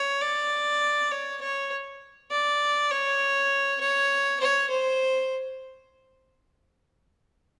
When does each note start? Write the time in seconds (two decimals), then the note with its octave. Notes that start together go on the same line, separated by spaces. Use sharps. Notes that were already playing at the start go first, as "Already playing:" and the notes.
Already playing: C#5
0.22 D5
1.11 C#5
1.41 C#5
2.31 D5
2.91 C#5
3.80 C#5
4.40 C#5
4.70 C5